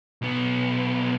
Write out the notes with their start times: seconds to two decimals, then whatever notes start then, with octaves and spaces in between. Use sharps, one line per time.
0.22 B1 B3